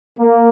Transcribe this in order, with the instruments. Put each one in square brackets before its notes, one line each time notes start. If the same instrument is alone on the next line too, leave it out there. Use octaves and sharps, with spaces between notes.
[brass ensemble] A#3